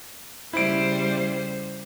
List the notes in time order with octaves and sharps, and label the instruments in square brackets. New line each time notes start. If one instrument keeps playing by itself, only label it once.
[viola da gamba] C#3 G3 C5 [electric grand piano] E4 D7